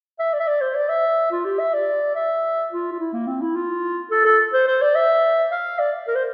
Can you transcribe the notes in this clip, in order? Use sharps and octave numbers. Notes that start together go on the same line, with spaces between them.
E5
D5
E5
D5
C5
D5
E5
F4
G4
E5
D5
E5
F4
F4
E4
A#3
C4
E4
F4
A4
A4
C5
C5
D5
E5
F5
D5
A#4
C5